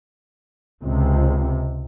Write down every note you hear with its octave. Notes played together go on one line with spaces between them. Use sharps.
C#2 C3